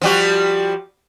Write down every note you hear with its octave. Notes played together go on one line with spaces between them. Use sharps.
F3 G3 F#4